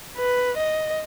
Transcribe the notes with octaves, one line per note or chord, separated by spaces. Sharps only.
B4
D#5